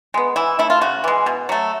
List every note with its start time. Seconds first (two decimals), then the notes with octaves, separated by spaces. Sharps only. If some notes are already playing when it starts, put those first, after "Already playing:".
0.14 G#3 B3
0.36 E3 E4
0.59 A3 E4
0.70 F4
0.81 C#3 F#4
1.04 E3 G#3
1.26 B2
1.49 F#3 A3